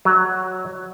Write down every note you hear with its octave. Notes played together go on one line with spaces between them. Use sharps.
F#3